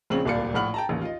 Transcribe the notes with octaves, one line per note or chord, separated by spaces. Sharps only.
A#1 C#3 C4 G#4 F#7
D1 C2 A#2 D5 F5 C#7
A#1 A2 F#5 F6 F#7
G5 A5 A#5
A1 D#2
F4 D#5